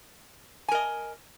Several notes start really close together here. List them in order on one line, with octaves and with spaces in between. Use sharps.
G#5 A#4 D#5